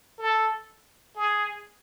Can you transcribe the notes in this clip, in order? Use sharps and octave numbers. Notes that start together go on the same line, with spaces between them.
A4
G#4